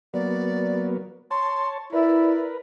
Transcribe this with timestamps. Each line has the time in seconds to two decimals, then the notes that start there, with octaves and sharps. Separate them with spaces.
0.14 F#3 A#3 B3 D5
1.31 C#5 A5 C6
1.93 E4 A#4 B4 D5